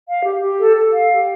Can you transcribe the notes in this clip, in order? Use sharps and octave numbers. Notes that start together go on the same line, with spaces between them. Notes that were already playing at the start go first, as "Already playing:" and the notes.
F5
G4
G4
A4
A4
F5
G4